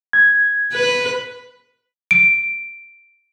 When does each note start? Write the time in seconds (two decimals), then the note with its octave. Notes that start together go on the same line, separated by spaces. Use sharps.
0.13 G#6
0.73 B4
2.11 D7